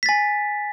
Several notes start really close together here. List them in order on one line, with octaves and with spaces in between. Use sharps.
B6 A6 G#5